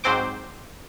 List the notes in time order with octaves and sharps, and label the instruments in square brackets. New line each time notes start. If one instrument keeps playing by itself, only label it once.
[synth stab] G#2 F#3 C4 C5 D6